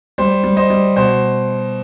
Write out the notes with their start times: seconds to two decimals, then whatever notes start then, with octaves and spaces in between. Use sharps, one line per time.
0.18 G3 C5
0.44 G3
0.57 C5 D#5
0.70 G3
0.96 B2 C5